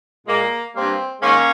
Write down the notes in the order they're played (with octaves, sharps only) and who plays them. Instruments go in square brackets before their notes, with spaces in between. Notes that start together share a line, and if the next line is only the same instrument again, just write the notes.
[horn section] A#2 G#3 A#3
G2 G3 A#3 C4
G#2 D#3 G#3 A#3 C#4